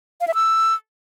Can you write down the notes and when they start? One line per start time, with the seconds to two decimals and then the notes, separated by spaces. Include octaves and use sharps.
0.21 F5
0.28 E5
0.34 E6